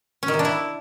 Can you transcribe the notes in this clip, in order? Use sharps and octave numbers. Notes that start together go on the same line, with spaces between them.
C#4
D#3
C3
D4
E4